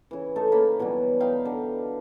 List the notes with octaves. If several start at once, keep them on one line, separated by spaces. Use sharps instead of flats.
C#3 E3
A3 D#4 A4
C#3 A#3 B5
B2 E3 F#3 G3
D#4 F5 G5 B5
D3